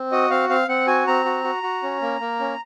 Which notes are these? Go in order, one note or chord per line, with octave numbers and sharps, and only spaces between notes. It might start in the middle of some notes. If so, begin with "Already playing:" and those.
Already playing: C4
F#4 D#5
C4 F5
C4 F5
C4 F#5
F#4 G#5
C4 A#5
F#4
F#4
F#4
C#4
A#3
A#3
C#4